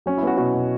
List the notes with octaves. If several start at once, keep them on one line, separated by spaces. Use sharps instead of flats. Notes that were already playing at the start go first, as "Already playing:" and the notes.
F#3 C#4
E4
B3 F#4
B2 F#4
B2